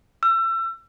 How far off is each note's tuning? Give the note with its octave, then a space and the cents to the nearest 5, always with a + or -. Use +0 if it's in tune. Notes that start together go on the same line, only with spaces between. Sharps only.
E6 +30